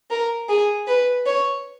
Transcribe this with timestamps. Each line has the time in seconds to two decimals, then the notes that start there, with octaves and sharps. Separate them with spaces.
0.11 A#4
0.49 G#4
0.87 B4
1.26 C#5